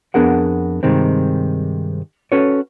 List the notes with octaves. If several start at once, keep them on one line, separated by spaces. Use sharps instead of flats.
F2 B3 D4 G#4 A#4 F#5
G2 C3 D#3 G#3 C4
C#4 F#4 A4 B4 C#5